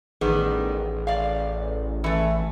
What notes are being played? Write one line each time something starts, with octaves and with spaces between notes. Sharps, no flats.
A1 D#3 G3 B3 G#4
D5 F5
E3 A3